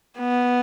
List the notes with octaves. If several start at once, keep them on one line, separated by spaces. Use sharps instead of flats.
B3